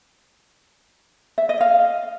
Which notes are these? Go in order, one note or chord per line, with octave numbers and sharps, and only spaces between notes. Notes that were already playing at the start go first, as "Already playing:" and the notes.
E5
D#5
F5